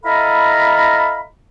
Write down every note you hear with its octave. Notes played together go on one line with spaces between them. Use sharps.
E4 A4 D#5 F5 A#5 B5